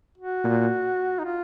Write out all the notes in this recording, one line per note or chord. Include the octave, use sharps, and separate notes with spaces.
F#4
A#2
D#4
F4